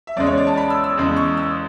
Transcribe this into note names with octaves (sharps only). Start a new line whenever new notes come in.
E5
E2 C#3 G#3 D5
C#5
D5
A5
B5
E6
E6
E2 C#3 G#3
C#6
E6